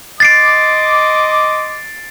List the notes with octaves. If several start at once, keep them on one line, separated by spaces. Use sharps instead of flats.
D#5 C6 D6 A6 C7 D7